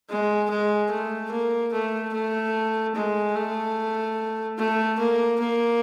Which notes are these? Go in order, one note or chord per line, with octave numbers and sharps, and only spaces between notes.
G#3
G#3
A3
A#3
A3
A3
G#3
A3
A3
A#3
A#3